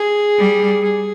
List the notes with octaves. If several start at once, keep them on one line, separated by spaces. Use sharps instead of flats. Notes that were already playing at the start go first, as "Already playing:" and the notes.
Already playing: G#4
G3
G#4